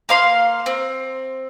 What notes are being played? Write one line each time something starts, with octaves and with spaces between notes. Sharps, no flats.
A#3 F5 C6
C4